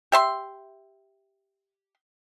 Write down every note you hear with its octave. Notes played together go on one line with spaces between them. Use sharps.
G4 E5 C6